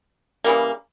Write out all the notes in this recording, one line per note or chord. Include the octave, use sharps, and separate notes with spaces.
C#3 E3 G3 A#3